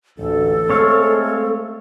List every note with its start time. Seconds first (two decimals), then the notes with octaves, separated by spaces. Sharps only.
0.19 A1 D2 A4
0.70 G#3 A3 C4 C#5 F5